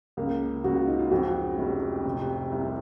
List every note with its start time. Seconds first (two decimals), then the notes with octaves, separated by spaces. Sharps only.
0.17 C#2 A#3
0.64 C#2 F#4
0.76 F4
0.88 D#4
0.99 F4
1.11 F2 F#4
1.58 F1
2.05 C3
2.52 C2